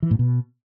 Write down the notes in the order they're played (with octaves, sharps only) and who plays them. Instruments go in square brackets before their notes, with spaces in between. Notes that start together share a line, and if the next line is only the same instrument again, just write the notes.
[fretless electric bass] E3
A2
B2